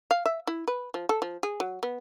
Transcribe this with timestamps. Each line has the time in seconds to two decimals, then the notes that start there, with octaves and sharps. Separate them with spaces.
0.11 F5
0.26 E5
0.47 E4
0.68 B4
0.94 F3
1.09 A4
1.22 F3
1.43 G#4
1.60 F#3
1.83 B3